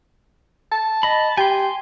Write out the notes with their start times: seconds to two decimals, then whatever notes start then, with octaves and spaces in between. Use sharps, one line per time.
0.72 A5
1.03 D#5 B5
1.37 G4 G#5 C6